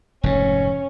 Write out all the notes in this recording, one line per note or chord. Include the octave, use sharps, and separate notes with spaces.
F1 G#2 C#4